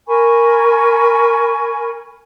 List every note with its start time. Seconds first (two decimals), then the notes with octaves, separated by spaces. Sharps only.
0.07 A#4 G#5 B5 C#6